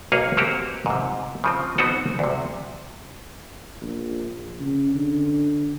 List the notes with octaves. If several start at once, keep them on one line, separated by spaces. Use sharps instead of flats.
B1 A#3 G#4 C#5
A#3 C4 F#4 G4
G#2 C3
C#3 F3 C4
B3 C4 D#4 F#4 A4
D2 C3
A#1
C#3
D3